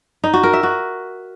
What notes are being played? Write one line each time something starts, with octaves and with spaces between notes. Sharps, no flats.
D#4
F#4
A#4
E5
F#4